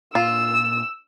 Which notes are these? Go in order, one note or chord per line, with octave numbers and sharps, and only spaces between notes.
A#2 F4 E6